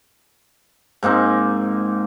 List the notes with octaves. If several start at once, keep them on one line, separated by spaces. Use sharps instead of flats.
G#2 A#3 C4 D#4